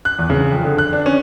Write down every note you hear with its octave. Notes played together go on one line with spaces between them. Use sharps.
F#6
E2
C#3
F2
D3
F#6
D4
C#4